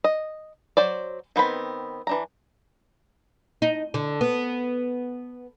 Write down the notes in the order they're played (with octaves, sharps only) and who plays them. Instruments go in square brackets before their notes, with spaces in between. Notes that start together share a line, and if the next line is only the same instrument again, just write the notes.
[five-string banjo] D#5
F#3 C5 D5
D#3 B3 C4 B5
E3 D4 A#5
[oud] D#4
D3
B3